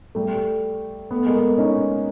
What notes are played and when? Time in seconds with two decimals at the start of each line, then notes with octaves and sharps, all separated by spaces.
0.15 G3 A3
1.11 A3 B3
1.26 G#3 A#3
1.58 C#4 D#4